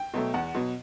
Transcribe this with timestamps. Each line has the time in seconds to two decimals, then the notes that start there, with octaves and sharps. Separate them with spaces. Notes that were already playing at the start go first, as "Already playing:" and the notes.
Already playing: G5
0.14 B2 F#3 A3
0.34 E2 F#5
0.54 B2 F#3